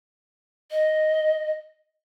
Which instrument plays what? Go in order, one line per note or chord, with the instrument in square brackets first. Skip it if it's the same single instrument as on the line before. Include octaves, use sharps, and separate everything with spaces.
[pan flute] D#5